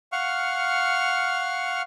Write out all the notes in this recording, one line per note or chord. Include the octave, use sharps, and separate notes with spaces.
F5 F#5 C#6 F6